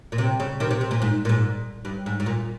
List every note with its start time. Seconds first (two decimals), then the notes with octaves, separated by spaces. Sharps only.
0.12 A#2
0.18 C3
0.40 C#3
0.60 C3 D#3
0.71 C3
0.81 C3
0.91 A#2
1.02 G#2
1.25 A#2
1.29 G#2
1.85 G2
2.06 G#2
2.20 G#2
2.26 A#2